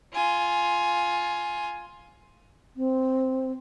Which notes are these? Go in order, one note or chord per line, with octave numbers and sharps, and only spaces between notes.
F4 G#5
C4